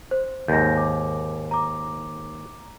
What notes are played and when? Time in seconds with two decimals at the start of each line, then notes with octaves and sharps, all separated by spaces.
0.11 C5
0.48 D#2 G#2 G6 A#6
0.77 D6
1.51 A#5 D6